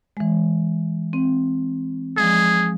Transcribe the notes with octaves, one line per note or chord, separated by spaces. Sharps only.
E3 G#3
C4
F3 G#3 G#4